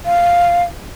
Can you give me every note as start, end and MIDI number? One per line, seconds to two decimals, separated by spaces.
0.06 0.63 77